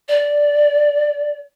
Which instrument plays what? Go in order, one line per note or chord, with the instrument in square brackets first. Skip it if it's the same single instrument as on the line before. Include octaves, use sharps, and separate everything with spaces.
[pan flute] D5